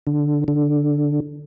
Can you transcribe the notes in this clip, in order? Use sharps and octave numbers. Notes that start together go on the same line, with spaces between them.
D3
D3